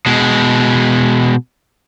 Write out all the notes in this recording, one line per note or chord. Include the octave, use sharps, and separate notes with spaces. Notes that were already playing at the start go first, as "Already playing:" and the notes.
B2 G#3